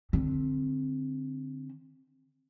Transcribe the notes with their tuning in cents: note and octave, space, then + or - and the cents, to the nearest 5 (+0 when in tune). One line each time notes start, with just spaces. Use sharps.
D3 +0 C4 +5